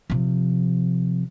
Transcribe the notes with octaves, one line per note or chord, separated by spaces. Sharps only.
C3 F3